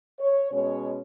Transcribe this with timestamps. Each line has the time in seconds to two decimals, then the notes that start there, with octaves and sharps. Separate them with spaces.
0.19 C#5
0.52 B2 G#3 C#4 C#5